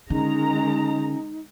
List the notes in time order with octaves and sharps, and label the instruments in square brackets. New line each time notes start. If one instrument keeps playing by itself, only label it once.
[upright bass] D3 [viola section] D#3 G#3 A#5 [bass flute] C#4 [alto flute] D#4